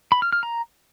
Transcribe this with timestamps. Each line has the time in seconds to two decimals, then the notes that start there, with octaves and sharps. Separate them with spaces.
0.12 B5
0.22 F6
0.33 F6
0.43 A#5